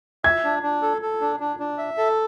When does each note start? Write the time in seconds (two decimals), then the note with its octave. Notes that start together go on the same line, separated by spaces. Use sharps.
0.24 E5 G#6
0.44 D4
0.63 D4
0.82 A4
1.02 A4
1.21 D4
1.40 D4
1.59 D4
1.78 E5
1.97 A4